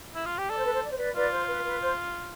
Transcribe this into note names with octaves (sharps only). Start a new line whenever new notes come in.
E4
F4
G4
A4 D5
C5
B4
C5
D5
C5
B4 D5
F4 B4 D5
C5
B4
B4
C5